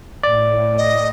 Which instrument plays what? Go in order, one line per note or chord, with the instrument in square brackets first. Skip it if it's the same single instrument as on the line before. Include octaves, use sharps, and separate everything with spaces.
[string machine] A2 [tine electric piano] D5
[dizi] D#5